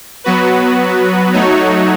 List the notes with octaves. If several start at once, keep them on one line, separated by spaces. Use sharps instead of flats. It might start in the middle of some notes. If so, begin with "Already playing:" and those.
F#3 B3 F#4 B4
F#3 A3 D#4 F#4 C#5